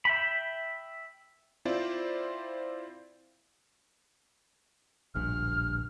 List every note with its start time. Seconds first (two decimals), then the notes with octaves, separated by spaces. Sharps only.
0.05 E5 G5 B5
1.65 C4 E4 F4 C5 D5
5.15 D1 A#1 G2 F6